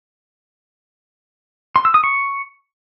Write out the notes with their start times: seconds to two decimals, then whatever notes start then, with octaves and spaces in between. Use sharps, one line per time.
1.76 C6
1.85 E6
1.94 D#6
2.04 C#6